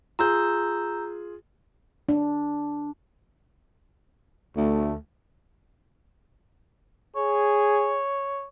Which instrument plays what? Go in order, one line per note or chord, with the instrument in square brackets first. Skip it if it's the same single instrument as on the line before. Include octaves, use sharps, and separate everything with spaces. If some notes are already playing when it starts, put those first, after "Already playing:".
[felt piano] F4 G#4 [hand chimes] A#5 E6 G6
[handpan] D4
[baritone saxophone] D2 [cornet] A3
[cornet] G#4 [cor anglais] C#5